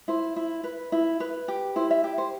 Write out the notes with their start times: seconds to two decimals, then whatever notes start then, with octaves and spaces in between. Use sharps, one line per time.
0.08 E4 C5
0.36 E4
0.64 B4
0.92 E4
1.20 B4
1.48 G4
1.76 E4 C5
1.91 E5
2.04 G4
2.18 C5